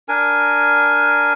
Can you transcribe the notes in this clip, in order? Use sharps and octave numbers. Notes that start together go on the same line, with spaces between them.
D4 A#4 G#5